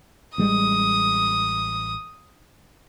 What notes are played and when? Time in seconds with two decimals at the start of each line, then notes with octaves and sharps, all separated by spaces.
0.38 A1 G3 G#3 D#6